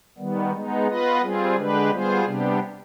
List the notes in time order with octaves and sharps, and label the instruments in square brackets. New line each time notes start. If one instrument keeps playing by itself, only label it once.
[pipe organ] D#3 G3 B3
G#3 B3 D#4
B3 F4 B4 D#5
G3 C4 F4 G#4
D3 G#3 D4 G4 B4
G3 B3 F4 G#4 C5
C3 G3 B3 D4 G4